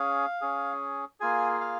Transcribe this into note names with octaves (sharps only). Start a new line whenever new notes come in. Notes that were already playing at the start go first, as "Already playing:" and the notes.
Already playing: C#4 G#4 F5
C#4 G#4
A#3 F4 G#4 G#5
F5